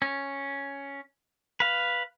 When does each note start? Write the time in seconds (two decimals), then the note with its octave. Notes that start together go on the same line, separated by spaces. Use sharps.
0.02 C#4
1.60 B4 F5